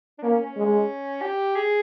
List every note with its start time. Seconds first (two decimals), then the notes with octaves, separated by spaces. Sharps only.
0.19 D4
0.23 A#3 C#4
0.34 C#4
0.46 C#4
0.57 G#3
1.22 G4
1.56 G#4